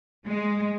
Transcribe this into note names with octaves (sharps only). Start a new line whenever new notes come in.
G#3